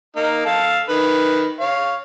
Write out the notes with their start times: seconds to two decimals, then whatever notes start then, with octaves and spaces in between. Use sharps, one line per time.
0.16 A#3 D#4
0.46 A4 F5 A5
0.89 D#3 B4
1.60 C#5 F5